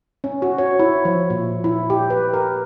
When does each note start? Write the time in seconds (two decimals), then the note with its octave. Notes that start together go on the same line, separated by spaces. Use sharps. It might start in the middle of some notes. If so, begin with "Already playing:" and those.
0.24 C#4
0.42 F#4
0.58 C#5
0.79 E4
1.05 F3
1.30 A#2
1.64 E4
1.90 G4
2.10 B4
2.33 A#4